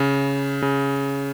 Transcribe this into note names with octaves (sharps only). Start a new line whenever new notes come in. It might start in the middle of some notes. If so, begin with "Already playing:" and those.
Already playing: C#3
C#3